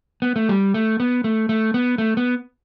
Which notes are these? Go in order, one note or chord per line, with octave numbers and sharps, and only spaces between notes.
B3
A3
G3
A3
B3
A3
A3
B3
A3
B3